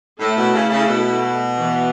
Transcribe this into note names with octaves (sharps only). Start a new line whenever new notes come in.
A2 A3 E4 A4
B2
C#3
C#3
B2
E3 B3 F#4